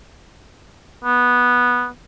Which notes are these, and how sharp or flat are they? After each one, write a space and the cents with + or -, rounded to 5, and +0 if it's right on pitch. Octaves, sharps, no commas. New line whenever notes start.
B3 -10